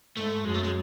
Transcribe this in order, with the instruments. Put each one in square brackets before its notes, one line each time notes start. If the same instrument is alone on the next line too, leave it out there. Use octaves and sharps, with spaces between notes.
[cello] G#2 [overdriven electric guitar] A3
[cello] F#2 [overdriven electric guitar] G#3
[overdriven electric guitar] A3
G#3